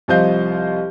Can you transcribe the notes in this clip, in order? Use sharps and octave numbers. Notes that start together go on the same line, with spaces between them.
C2 F3 C5 D#5 F5 G6